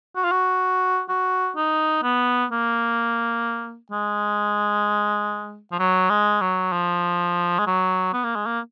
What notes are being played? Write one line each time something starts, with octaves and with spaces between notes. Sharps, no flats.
F#4
F4
F#4
F#4
D#4
B3
A#3
G#3
F3
F#3
G#3
F#3
F3
G#3
F#3
B3
A#3
G#3
A#3